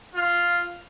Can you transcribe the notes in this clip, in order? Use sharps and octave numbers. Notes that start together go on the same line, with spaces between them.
F4